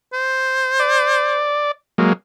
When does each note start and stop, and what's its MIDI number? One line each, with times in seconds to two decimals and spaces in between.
0.13 1.51 72
0.80 1.71 74
1.98 2.13 54
1.98 2.13 56
1.98 2.13 58